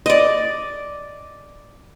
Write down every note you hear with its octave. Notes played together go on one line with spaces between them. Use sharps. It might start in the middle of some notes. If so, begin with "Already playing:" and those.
D5 D#5